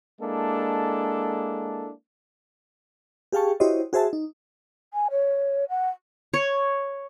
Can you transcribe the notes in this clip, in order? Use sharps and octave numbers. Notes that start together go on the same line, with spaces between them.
G#3 A#3 D4 E4 A4
G4 G#4 F5 G5 A5 C#6
E4 F#4 G4 C5 C#5 D#5
F#4 G#4 C5 E5 A5
D#4
G#5
C#5
F#5
C#5